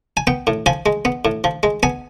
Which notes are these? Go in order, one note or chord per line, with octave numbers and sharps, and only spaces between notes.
G#5
B3 G5
A2
F3 G#5
G#3
B3
A2
F3
G#3
B3 G#5